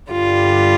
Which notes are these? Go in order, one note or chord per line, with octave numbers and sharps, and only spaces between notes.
G2 D3 G3 F4